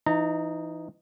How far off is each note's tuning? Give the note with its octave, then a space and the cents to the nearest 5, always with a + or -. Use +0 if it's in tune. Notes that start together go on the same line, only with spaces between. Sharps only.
E3 +30 D#4 +0 A#5 -30